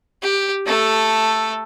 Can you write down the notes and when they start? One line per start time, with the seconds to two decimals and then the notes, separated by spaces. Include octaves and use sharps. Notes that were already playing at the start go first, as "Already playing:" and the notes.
0.23 G4
0.66 A3 A4